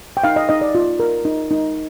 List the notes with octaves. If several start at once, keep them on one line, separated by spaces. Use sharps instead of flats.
G5
D#4 F5
D#5
D#4 D#5
D5
F4
A#4
D#4
D#4